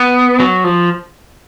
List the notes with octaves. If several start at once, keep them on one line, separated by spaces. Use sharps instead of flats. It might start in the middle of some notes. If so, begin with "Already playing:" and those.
Already playing: B3
F#3
F3